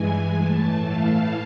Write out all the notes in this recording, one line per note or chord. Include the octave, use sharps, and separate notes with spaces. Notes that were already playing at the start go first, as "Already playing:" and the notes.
Already playing: G2 E3 G#3 G#5
A2 E3 A3 A5
F5